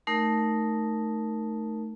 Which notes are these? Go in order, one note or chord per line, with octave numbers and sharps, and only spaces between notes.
A3 D#4 A#4